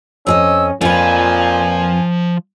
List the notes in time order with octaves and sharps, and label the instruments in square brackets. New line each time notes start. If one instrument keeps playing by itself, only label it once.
[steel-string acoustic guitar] F2 G#4 D#5 [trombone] C#4 [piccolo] E6
[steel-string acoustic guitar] F2 B4 [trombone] A#2 [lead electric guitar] F3 F4 [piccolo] G#5